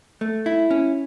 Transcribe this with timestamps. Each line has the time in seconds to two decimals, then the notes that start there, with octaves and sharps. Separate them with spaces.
0.21 A3
0.46 E4
0.70 C#4